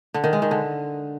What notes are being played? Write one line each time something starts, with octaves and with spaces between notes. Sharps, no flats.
D3
D#3
G#3
D#3
D3